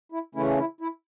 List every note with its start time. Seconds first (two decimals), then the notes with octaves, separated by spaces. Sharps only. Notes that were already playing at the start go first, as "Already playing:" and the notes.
0.12 E4
0.35 C#3 E3 A3 C#4 E4
0.58 E4
0.81 E4